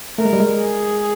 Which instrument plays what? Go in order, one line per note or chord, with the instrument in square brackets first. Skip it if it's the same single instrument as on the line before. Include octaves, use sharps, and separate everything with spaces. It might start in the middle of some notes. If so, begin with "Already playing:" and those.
[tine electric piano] A3 [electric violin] A#4
[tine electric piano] G#3
G3
G#3
[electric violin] G#4